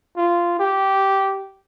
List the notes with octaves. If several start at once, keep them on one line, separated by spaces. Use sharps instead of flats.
F4
G4